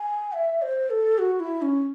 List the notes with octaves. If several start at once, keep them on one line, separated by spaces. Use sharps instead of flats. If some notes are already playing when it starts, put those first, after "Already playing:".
Already playing: G#5
E5
C5
A4
F#4
E4
C#4